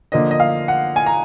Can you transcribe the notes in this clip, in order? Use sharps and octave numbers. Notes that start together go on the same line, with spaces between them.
D3 F3 A#3 D4 D#5
D#5
F5
F#5
G#5
A#5